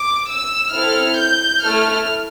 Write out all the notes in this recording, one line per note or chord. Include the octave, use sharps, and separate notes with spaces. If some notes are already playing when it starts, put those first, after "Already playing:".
Already playing: D6
E6
C4 E4 A4 F6
G6
A3 E4 A4 F6